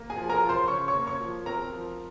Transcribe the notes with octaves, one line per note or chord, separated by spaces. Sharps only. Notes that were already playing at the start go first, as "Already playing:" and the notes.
Already playing: A#3
G#4 G#5
F3
A#4 A#5
F4
C5 C6
C#3 C#5 C#6
C#5 C#6
A#3
C#5 C#6
F3
C4 A#4 A#5
F3